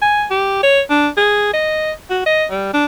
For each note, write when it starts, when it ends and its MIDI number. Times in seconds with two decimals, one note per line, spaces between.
0.02 0.25 80
0.30 0.62 67
0.63 0.80 73
0.90 1.08 62
1.17 1.53 68
1.54 1.92 75
2.10 2.23 66
2.26 2.46 75
2.51 2.74 55
2.74 2.86 62